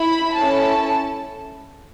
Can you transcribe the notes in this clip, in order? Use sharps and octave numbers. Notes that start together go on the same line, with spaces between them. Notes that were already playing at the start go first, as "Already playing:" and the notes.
Already playing: E4 B5
C#4 E4 A4 A5